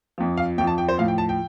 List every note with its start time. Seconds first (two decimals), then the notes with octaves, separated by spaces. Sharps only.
0.18 F2 F3
0.37 F5
0.58 F2 G5
0.61 F3
0.67 A5
0.78 G5
0.89 C5
0.98 A2 F3 F5
1.08 G5
1.18 A5
1.29 G5